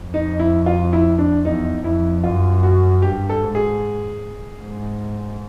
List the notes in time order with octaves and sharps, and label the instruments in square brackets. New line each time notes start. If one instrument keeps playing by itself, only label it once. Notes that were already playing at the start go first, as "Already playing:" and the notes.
Already playing: [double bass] F2
[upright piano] D#4
E4
F4
E4
D4
[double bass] E2 [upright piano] D#4
[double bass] F2 [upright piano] E4
[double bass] F#2 [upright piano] F4
[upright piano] F#4
[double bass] G2 [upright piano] G4
[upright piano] A4
[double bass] G#2
[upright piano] G#4
[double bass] G#2